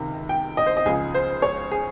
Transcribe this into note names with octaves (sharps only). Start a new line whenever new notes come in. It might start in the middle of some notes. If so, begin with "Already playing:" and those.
Already playing: C#2 C3 D#3
G5
D#5
C5
D#5
C#2 C#3 F3 G#4
C5
C#5
G#4